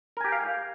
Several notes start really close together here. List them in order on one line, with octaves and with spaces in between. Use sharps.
A#4 G#5 G4 G5 F5